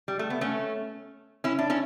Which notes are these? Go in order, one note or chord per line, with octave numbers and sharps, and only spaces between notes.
G3
A3
B3
A3 C#4
C#4 E4
D4
C#4 E4